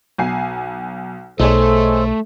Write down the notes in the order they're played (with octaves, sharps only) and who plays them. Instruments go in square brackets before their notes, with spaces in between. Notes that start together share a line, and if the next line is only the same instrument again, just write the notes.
[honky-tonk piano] B1 G#5 C7
[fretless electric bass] B1 [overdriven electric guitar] A3 [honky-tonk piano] D#4 G#4 C#5 [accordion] A4 C5